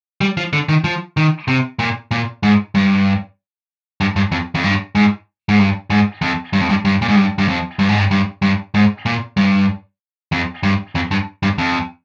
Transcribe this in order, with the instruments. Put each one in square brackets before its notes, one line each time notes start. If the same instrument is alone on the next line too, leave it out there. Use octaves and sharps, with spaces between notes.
[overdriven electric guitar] G3
F3
D3
D#3
F3
D#3
C3
A#2
A#2
G#2
G2
G2
G2
F2
F2
G2
G#2
G#2
G2
G#2
F2
G2
F2
G2
G2
A#2
G#2
G2
G2
F2
G2
G#2
G2
G2
G2
G#2
A#2
G2
F2
G2
F2
G2
G2
F2